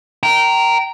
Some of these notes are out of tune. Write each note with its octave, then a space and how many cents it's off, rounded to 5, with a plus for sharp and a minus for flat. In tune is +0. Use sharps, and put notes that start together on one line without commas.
G5 -25 A#5 -5